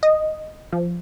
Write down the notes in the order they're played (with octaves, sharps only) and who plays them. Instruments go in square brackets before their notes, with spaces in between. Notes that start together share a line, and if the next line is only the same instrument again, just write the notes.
[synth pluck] D#5
F3